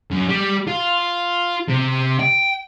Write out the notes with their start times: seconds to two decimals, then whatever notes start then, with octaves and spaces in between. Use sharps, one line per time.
0.11 F#2
0.29 G3
0.68 F4
1.68 C3
2.19 G5